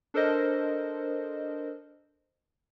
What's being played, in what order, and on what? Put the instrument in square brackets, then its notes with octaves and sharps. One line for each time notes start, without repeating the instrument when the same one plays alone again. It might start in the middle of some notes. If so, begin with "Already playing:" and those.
[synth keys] D4 A4 A#4 C5 D#5